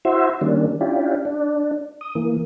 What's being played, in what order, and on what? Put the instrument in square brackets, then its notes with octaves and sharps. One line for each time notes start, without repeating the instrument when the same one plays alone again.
[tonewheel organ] E4 F#4 C5 E5
D#3 G3 A#3 C#4 D4
C#4 D4 E4 F4 G4
D4
D#6
E3 A#3